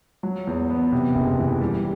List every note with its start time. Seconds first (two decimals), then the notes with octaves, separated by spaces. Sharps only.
0.23 F#3
0.47 E2
0.70 B3
0.92 C3
1.15 F#1
1.39 E3
1.61 G3